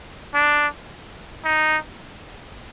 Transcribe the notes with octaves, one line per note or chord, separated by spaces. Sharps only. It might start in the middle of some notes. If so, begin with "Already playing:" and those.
D4
D#4